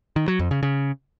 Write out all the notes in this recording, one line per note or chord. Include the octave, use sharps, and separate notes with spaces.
D#3
F#3
F2
C#3
C#3